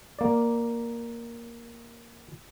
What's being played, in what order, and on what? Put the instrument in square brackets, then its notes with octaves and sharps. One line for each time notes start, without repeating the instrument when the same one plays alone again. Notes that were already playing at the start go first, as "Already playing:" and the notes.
[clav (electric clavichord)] A#3 D5